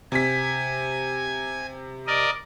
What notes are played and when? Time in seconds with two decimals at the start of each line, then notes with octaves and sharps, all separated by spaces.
0.12 C3 G#5 B6
2.07 A#4 D5 D#5